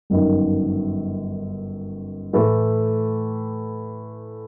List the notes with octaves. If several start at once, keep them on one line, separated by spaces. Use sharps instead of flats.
G1 F#2 D#3
A2 E3 A3